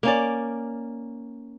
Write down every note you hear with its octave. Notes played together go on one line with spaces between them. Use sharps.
A#3 C#4 D5